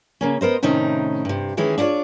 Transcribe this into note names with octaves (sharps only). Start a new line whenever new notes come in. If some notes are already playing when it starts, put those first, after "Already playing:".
C#3 A#3 C#4
B3 A#4 C5 D#5
A2 C3 D#3 C#4 D#4
G2 C3
D#3 E3 G#3 C#4 E4
D4 E4 F4 C#5 D5